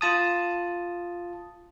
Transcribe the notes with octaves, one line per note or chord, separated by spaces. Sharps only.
F4 A5 D#6